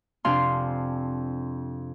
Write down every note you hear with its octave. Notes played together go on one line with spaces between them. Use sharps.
F2 C3 D4 F5 G#5 C6